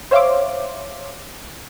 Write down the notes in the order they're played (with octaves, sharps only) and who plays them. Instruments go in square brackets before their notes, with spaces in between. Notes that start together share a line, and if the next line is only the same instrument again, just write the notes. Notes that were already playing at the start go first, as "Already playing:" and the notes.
[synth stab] C5 C#5 E5 F5 C6 D6